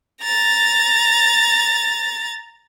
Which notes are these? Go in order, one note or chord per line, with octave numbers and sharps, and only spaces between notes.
A#5 A6